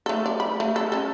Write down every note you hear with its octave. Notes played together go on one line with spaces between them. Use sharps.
A3 A4
D5
B5
A3
A4
C#4 A4